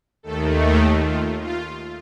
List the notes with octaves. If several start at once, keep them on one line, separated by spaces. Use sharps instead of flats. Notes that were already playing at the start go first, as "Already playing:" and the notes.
D#2 D#3 A3 A4
G4
F4
F4